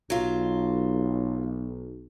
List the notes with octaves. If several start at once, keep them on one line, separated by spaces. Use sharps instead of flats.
B1 F#3 F4